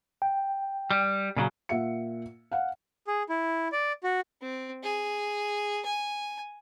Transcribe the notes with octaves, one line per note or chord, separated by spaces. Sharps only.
G5
G3
A#2 C#3 F#3
A#2 F4 E5 F#5 C#7
F5 F#5
G#4
E4
D5
F#4
C4
G#4
G#5